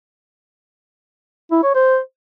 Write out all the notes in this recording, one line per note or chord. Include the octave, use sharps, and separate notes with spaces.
E4
C#5
C5